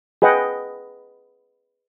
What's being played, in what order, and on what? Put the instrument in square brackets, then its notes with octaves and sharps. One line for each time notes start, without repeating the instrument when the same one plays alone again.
[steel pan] G#4 B4 D#5 F#5 G5